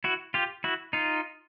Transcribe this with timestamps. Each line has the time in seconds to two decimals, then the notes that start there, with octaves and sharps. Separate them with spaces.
0.04 E4 F#4
0.34 F4 G4
0.64 E4 F#4
0.93 D#4 F4